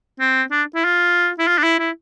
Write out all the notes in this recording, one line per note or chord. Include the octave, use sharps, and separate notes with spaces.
C4
D4
E4
F4
E4
F4
D4
E4
E4